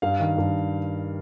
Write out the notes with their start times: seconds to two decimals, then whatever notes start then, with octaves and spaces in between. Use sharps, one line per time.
0.02 G2 F5
0.20 D#3
0.38 G2